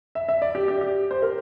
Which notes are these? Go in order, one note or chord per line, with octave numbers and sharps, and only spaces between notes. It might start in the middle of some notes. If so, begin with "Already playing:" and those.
E5
E5
D5
G4
G4
G4
C5
A#4